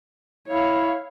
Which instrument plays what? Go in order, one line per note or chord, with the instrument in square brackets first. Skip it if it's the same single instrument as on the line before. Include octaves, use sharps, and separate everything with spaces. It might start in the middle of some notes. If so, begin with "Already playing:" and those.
[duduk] E4 [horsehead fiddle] C#5 F5